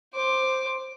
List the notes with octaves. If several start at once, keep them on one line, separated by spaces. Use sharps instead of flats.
C5 D6